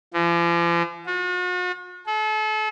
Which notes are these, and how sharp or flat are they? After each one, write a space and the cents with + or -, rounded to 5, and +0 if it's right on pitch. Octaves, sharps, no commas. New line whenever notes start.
F3 -45
F#4 -45
A4 -35